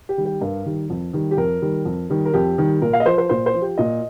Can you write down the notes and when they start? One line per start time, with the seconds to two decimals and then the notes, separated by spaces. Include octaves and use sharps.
0.09 G4
0.17 D#3 G3
0.25 G4
0.41 G2 A#4
0.66 D#3 G3
0.90 F2
1.13 D#3 G3
1.31 G4
1.37 F2 A#4
1.62 D#3 G3
1.85 F2
2.10 D#3 G3
2.25 A#4
2.34 F2 G4
2.58 D#3 G3
2.82 A#2 A#4
2.93 F5
3.00 D#5
3.06 F3 C5
3.18 C5
3.29 A#2 C5
3.46 C5
3.55 F3
3.62 G4
3.78 A#2 D#5